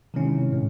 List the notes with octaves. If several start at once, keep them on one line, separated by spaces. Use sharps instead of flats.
C3 D#3 G#3 C#4 E4
A2 G#3